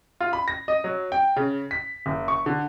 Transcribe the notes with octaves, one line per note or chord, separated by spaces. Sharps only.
F4
B5
A#6
D#5
F#3
G5
C#3
B6
F#1
C#6
D3